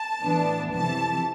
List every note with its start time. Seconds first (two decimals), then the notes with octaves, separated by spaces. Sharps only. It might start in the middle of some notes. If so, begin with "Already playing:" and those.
Already playing: A5
0.21 A2 E3 B3 D4
0.72 F2 C3 E3 A5